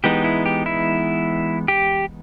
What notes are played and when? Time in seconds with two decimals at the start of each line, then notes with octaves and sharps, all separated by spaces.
0.04 E3 G#3 B3 D#4 G4
0.24 E4
0.46 G4
0.66 E4
1.68 G4